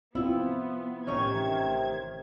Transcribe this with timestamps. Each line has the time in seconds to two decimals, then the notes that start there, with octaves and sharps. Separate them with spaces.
0.15 B3 C4 E4 F4
1.07 A1 C3 D#3 C#4 D#4 C#5 G#6